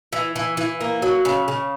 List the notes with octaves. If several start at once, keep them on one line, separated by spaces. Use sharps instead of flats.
E3
E3
E3
A#3
F#3
C#3
C#3